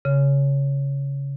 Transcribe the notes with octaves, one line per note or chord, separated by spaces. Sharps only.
C#3